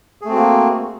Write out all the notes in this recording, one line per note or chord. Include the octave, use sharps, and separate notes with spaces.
A3 A#3 C4 F#4 G#4